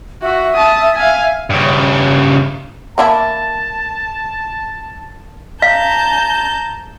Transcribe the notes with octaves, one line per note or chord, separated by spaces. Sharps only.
F#4 E5
A5 D#6
F5 G#5
G2 C#3
A#3 D4 E4 A5
F5 A5 A#5 G6